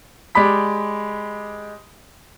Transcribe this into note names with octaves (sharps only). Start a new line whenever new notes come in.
G#3 G4 D5 B5 B6